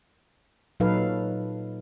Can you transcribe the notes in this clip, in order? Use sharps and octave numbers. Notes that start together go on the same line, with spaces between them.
A#2 F#3 D#4 A4 B4 F5